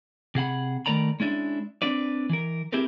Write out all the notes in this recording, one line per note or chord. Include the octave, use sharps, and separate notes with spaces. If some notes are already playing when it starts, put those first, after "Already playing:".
C3 G#4 F#5 B5
D#3 A3 A#4 D5 A#5 B5
G#3 C#4 D4 E4
C4 D4 B4 D5
E3 A#4
C4 E4 G4 G#4 A#4 B4